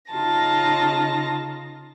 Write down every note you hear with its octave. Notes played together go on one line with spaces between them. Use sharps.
C#3 D#4 F4 A5 A#6